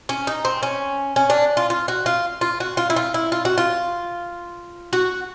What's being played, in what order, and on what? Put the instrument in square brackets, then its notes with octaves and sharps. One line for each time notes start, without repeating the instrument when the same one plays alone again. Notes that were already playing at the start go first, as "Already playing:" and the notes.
[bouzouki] C#4
D#4
C4
C#4
C#4
D4
F4
F4
F#4
F4
F4
F#4
F4
E4
F4
E4
F4
F#4
F4
F#4